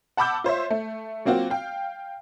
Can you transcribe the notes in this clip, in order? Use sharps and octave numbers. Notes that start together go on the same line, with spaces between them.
F#5 A5 B5 D6 E6 G6
F4 C5 C#5 E5
A3
F#3 A#3 C4 F4 F#4
F5 G5